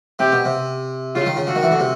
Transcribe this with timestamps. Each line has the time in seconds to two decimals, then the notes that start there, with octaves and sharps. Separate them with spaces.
0.19 C3 G4
0.32 B2
0.45 C3
1.15 C#3 F4
1.26 D#3
1.37 C#3
1.47 D3 F#4
1.55 D#3
1.63 E3
1.71 D3
1.80 C3